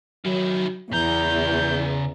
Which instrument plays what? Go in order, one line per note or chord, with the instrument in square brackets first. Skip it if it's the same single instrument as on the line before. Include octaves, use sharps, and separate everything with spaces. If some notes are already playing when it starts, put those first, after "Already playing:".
[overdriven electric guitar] D#3 E4 [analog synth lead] F#3
[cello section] E2 [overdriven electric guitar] C#3 A#5 [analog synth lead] G6